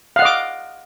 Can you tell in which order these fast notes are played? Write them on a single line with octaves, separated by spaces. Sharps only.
F5 F#5 D#5 D6